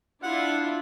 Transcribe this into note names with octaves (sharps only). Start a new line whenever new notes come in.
D4 E4 F4 F#5